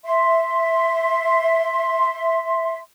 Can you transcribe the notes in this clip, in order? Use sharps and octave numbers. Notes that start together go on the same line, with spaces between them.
E5 C6